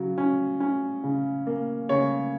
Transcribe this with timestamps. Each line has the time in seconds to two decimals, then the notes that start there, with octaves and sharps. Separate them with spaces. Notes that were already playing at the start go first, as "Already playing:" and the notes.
Already playing: C#3 F#3
0.18 C#4
0.60 C#4
1.03 C#3
1.47 A#3
1.89 C#3 C#5